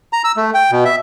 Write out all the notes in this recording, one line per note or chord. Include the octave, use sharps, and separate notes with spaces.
A#5
E6
A3
G5
B2
E5